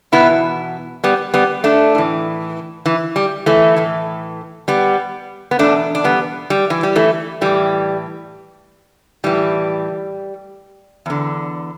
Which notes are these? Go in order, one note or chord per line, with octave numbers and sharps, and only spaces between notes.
E2 B2 B3 E4
G3 B3
G3 B3
A3 D4
A2 E3
E3
G3
E3 A3
A2 E3
G3 B3
B3
E2 B2 A3 D4
D4
G3 B3
G3
E3
G3
E3 A3
A2 E3 G3
A2 E3 G3
E2 D3